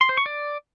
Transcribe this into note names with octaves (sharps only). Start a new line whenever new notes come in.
C6
C5
C#6
D5